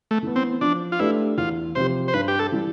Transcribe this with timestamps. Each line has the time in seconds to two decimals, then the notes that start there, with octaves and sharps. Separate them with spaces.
0.11 A3
0.23 E3 B3
0.36 C4
0.61 F3 D4
0.92 F4
0.99 A3 D4 E4 G4 B4
1.38 E2 F4
1.75 C3 F3 C4 G4 C5
2.08 C5
2.14 G2 B4
2.28 G4
2.39 A4
2.52 E3 G3